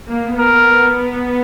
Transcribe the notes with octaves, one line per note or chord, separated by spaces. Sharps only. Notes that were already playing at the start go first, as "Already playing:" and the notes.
A#3
B3 A#4